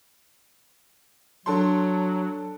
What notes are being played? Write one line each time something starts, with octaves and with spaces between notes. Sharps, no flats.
F#3 D4 A4 C6